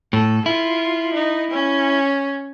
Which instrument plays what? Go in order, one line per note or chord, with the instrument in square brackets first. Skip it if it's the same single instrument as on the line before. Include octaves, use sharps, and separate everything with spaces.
[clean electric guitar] A2 [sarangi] A4
[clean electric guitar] E4 [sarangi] F4
[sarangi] D#4
C#4